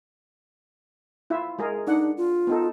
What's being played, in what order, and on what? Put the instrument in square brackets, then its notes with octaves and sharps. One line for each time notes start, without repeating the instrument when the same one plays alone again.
[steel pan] E4 F4 E5
G#3 G#4 A#4
[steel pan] D4 F#5 [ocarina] D#4
[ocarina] F4
[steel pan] B3 D#4 A4